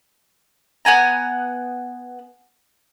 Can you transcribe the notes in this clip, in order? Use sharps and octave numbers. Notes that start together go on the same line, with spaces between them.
B3 F#5 G#5 A#5